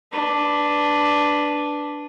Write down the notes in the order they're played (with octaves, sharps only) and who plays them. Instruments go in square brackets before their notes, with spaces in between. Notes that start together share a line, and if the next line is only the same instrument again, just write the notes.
[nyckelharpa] D4 B4